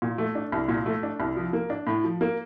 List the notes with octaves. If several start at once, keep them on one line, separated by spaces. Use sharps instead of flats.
A#2
A3
D4
C2
A#2
A3
D4
C2
F3
A#3
D4
A2
F3
A#3